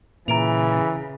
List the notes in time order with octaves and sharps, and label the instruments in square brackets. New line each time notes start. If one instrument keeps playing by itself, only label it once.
[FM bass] A#2 [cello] C#3 [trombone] E3 [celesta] A#5 D7 F7